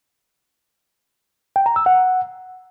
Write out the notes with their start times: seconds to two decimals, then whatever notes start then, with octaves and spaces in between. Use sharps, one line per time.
1.56 G5
1.66 A#5
1.76 E6
1.86 F#5